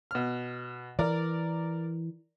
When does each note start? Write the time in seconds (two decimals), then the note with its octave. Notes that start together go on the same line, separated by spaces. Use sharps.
0.11 B2 F6
0.99 E3 A#4 D5